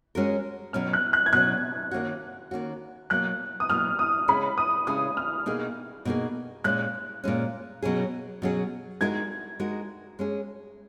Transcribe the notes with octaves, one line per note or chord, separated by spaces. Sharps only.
G#3 C#4 F#4 A#4
B2 F#3 C#4 F6
F#6
F#6
G#6
B2 F#3 C#4 F#6
D#3 A#3 C#4 F#4
D#3 A#3 C#4 F#4
B2 F#3 A#3 F#6
D#6
B2 F#3 A#3 F6
D#6
C#3 G#3 C#4 G#4 B5
D#6
C#3 G#3 C#4 G#4 D#6
F6
B2 A#3 D#4 G#4
B2 A#3 D#4 G#4
A#2 G#3 C#4 F#6
A#2 G#3 C#4
B2 F#3 C#4 G#4
B2 F#3 C#4 G#4
G#3 D#4 F#4 A#4 G#6
G#3 D#4 F#4 A#4
G#3 C#4 G#4